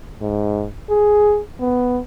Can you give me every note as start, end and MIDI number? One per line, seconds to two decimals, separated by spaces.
0.21 0.65 44
0.89 1.40 68
1.61 1.99 59